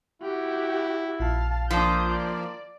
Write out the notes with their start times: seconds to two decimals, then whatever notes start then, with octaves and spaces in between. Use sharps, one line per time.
0.22 E4 F#4 G4
1.20 A#1 F4 F5 A5
1.70 F3 A#3 D4 D#6 G6
2.10 D5